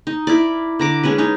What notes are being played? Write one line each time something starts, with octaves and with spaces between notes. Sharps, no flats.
D#4
E4 A#4 D5
D3 A#5 D6
G#3 C#4 D4 B4
C#4 D#4